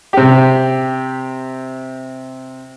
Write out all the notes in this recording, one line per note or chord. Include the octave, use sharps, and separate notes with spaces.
C3 G4